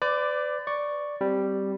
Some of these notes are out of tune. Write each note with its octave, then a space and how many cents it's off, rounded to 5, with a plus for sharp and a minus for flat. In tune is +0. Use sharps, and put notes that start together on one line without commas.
B4 +45 D5 +0 D6 +10
D5 +0 C#6 +0
G3 +0 C4 +0